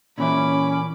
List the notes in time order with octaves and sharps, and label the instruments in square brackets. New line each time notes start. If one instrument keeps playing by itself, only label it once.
[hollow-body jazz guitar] A#2 E3 E5 [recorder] C#4 [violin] B5 D6